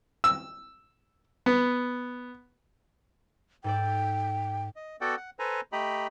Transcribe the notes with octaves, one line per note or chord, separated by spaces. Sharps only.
E6
B3
G#2 A4 D5 G5
D#5
B3 F#4 A4 D5 F#5 G5
F#5
A4 B4 C5 G#5 A#5
A3 G4 D#5 G5 A#5 B5